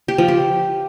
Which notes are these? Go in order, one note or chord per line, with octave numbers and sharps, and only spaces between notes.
G4
F3
G4